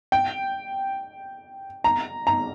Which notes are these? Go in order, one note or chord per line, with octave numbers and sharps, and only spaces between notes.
G5
A#5
A#5